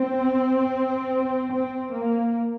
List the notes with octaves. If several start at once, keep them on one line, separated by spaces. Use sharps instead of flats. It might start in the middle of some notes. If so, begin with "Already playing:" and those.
Already playing: C4
C4
A#3